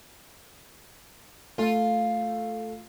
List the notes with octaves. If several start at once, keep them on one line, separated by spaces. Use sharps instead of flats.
A3 F4